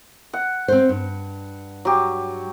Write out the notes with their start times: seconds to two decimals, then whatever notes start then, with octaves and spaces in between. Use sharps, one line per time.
0.33 F#5
0.68 C4 C5
0.89 G2
1.85 F#3 G4